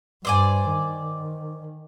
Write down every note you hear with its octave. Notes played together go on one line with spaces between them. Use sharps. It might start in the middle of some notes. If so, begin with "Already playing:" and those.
G2 C5 D5 G#5
D#3